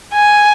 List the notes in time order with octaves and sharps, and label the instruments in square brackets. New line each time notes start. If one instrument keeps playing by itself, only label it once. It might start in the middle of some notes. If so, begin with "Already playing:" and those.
[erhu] G#5